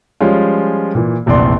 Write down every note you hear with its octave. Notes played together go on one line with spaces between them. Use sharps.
F3 G3 G#3 C#4 F4
A#2 E3
F1 A#1 E2 C3 D5 C6